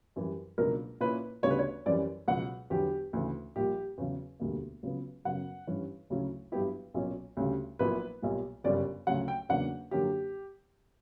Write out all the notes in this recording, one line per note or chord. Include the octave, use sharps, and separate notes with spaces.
F#2 E3 G3
C#2 B2 F#3 A#3 D4 A#4
A#2 A#3 C#4 E4 B4
D2 C#3 G3 B3 D4 C#5
B4
C#5
F#2 E3 G3 C#4 D5
C#2 B2 F#3 F#5
E2 D3 F#3 B3 G4
D2 C#3 E3
A#1 A#2 G3 G4
E2 C#3 F#3
E1 D2 D3 G3 A#3
C#2 C#3 F#3 B3
F#2 C#3 F#3 B3 F#5
G2 E3 G3 C#4 E4
D2 C#3 F#3 C#4 E4
G2 F#3 B3 E4 G4
B1 A#2 F#3 C#4
D2 C#3 G3 C#4
A#1 A#2 F#3 B3 E4 B4
B1 A#2 G3
G1 F#2 C#3 G3 C#4 D5
D2 C#3 F#3 F#5
G5
E2 C#3 F#3 A#3 D4 F#5
F#2 D3 F#3 A#3 C#4 G4